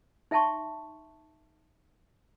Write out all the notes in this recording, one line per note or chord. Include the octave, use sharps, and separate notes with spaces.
D#4 E5 G5 A5 C6 C#6